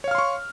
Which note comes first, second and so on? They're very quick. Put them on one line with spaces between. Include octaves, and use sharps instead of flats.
C#5 F5 F6 C6 C#6